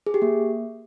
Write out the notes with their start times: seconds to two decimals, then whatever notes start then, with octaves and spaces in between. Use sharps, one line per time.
0.07 G#4
0.14 G4
0.22 A#3